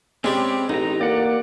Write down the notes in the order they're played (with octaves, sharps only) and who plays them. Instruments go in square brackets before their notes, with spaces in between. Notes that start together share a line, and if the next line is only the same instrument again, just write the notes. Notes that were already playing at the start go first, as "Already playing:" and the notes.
[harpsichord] G3 G#3 [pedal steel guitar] C4 C#4 G4
[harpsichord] A1 [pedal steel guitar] D#4 A#5
[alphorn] A#3 [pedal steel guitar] D5 F#5